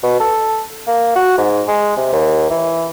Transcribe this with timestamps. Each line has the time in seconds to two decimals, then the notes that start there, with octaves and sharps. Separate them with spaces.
0.03 B2
0.20 A4
0.87 A#3
1.15 F#4
1.37 G#2
1.68 G#3
1.97 C3
2.12 D#2
2.50 E3